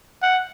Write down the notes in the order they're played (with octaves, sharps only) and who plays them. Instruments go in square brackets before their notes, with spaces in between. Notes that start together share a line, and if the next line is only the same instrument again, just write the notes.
[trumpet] F#5